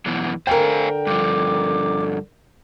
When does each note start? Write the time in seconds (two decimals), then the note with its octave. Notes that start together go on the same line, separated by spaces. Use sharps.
0.06 F#2 B2 E3
0.47 D3 A#4 C5 F5 G5 G#5
1.07 G2 F3 D6